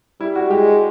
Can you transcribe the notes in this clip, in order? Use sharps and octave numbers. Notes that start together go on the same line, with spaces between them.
G3 E4
F#4
G#3 G4